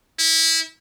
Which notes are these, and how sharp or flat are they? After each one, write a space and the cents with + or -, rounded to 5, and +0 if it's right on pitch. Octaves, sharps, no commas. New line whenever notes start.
E4 -20